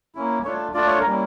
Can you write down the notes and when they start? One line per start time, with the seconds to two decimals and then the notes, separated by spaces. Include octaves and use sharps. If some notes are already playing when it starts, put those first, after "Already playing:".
0.15 A#3 C#4 E4
0.44 A3 D4 F4 C#5
0.74 A3 D4 F4 D5
0.87 C#5
1.00 A#4
1.05 G3 A#3 C#4 E4